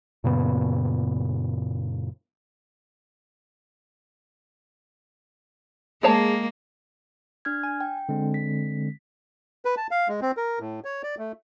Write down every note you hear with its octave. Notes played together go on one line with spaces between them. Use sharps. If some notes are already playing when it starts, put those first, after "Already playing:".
F#2 A#2 C#3 B3
G#3 A#3 G#4 C#5 A5
D4 F6 G#6
G#5
G5
D3 G#3 C4
B6
B4
A5
F5
G#3
C4
A#4
A2
C#5
D5
A3